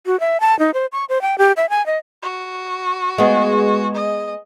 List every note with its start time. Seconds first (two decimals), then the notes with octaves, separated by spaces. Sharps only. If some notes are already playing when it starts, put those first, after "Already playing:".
0.06 F#4
0.20 E5
0.41 A5
0.59 D#4
0.74 C5
0.92 C#6
1.09 C5
1.22 G5
1.38 G4
1.57 E5
1.70 G#5
1.86 D#5
2.22 F#4
3.18 G#3 B3
3.95 D#5